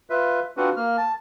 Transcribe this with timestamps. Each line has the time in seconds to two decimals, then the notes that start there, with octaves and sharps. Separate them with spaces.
0.10 F4 B4 E5
0.57 C4 D4 F4 F#4 B4
0.76 A#3 F6
0.97 A5